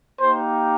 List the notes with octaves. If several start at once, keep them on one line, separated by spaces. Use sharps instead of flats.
A#3 D#4 G4 C5